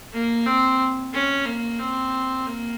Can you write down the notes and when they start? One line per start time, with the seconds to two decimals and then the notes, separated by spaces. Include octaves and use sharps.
0.13 A#3
0.46 C4
1.13 C#4
1.46 A#3
1.79 C4
2.47 A#3